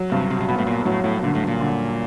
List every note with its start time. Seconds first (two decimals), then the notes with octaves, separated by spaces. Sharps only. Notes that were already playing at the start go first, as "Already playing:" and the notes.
Already playing: F#3
0.12 G2 C3
0.30 C3
0.40 C3
0.48 B2 B3
0.58 A2
0.67 A#2
0.85 A2 F#3
1.04 A2
1.23 A#2 D3
1.35 A2
1.47 A#2
1.61 D3